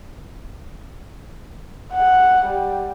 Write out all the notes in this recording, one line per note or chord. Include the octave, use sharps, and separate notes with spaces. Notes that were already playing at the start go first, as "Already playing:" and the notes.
F#5
G3